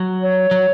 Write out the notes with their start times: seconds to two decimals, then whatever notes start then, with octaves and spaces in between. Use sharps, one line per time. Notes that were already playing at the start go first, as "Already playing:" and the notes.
Already playing: F#3
0.21 C#5
0.51 F#3